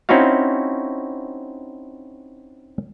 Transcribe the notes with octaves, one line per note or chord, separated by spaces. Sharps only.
C4 C#4 D#4 E4 F#4 F5